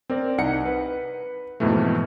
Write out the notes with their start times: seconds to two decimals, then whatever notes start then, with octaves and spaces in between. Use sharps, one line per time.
0.10 C4 A#4 D5
0.38 C2 D#4 F#5 C#7
0.65 B4
1.60 F2 G#2 B2 E3 A3